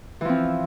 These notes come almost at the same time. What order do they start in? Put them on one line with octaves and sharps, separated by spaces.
E3 F3 C4